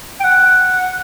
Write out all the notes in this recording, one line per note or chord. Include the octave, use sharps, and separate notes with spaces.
G5
F#5